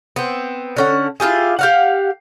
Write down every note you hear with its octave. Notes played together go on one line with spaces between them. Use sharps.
B3 C4
D3 C#4 F#5
E4 F4 G4 G#4
G4 F5 F#5